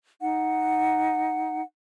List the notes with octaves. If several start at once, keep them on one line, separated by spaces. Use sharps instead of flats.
D#4 F#5